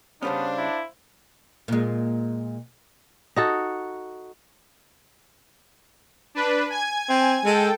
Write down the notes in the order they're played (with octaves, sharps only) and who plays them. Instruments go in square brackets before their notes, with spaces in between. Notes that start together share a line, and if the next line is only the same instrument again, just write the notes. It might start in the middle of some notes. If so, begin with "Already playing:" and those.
[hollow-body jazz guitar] C#3 G3 C#4 [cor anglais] B3 [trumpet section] D4 [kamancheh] C5 F5
[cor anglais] E4
[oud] A#2 G#3
[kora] D#4 F#4 A4
[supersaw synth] D4 B4
G#5 G#6
[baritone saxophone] C4
[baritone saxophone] G#3 [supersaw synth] A4 G5